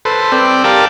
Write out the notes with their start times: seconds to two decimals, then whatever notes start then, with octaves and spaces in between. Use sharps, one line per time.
0.05 A4 B4 C5
0.32 C4 D5 G5
0.64 G4 A#4 D5 F5 G5 A5